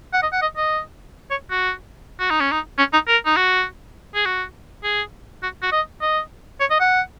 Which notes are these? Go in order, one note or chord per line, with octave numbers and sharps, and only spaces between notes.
F#5
D#5
F#5
D#5
D#5
C#5
F#4
F#4
D#4
C#4
D#4
C#4
D#4
A#4
D#4
F#4
G#4
F#4
G#4
F#4
F#4
D#5
D#5
C#5
D#5
F#5